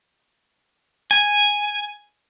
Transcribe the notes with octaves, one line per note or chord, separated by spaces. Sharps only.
G#5